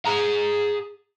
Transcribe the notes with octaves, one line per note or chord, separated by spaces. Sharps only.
G#4 A#5